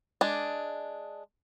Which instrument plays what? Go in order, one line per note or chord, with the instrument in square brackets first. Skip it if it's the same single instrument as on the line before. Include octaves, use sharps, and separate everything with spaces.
[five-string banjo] G#3 D4